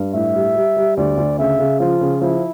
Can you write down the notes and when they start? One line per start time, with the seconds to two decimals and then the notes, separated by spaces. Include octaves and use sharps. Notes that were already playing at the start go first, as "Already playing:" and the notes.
Already playing: G2
0.14 A2 E5
0.34 G3
0.55 G3
0.76 G3
0.97 D2 D5
1.17 D2
1.39 C#3 E5
1.59 C#3
1.80 F3 F4
2.01 C#3
2.21 F3 E4